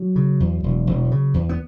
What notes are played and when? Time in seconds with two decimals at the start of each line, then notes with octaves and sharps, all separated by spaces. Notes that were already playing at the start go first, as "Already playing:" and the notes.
Already playing: F#3
0.16 C#3
0.40 E2
0.64 E1
0.87 E1
1.12 C#3
1.34 E2
1.49 B3